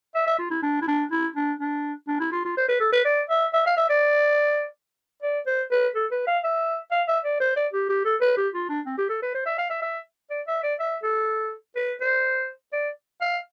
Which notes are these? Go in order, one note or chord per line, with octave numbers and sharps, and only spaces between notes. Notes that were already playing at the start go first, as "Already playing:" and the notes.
E5
E5
F4
E4
D4
E4
D4
E4
D4
D4
D4
E4
F4
F4
C5
B4
A4
B4
D5
E5
E5
F5
E5
D5
D5
C5
B4
A4
B4
F5
E5
F5
E5
D5
C5
D5
G4
G4
A4
B4
G4
F4
D4
C4
G4
A4
B4
C5
E5
F5
E5
E5
D5
E5
D5
E5
A4
B4
C5
D5
F5